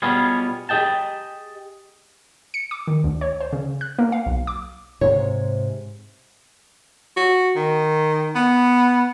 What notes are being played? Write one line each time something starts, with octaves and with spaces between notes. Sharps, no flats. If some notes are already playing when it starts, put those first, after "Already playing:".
B2 G3 B3 C#4 F4 G#4
G4 G#4 D#5 G5 A5
C#7
D6
D#3
D2
C#5
C5
C#3
F#6
A#3
F5
B1
D6
G#2 C3 C#5
F#4
D#3
B3